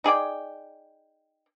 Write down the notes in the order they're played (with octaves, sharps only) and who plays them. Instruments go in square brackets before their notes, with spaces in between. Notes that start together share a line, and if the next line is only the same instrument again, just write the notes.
[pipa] D#4 G#4 D5 G5